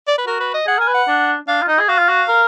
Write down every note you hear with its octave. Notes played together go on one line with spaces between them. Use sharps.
D5
B4
F#4 A#4
B4
D#5
G#4 F#5
A#4 G#5
B4
F#5
D4
D4 F5
F4
D#4 D#5
G#4
F#4 F5
F4
F#4
A#4